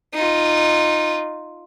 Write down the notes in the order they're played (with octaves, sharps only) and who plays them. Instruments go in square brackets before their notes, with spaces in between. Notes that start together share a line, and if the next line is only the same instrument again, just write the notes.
[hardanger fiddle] D#4 F4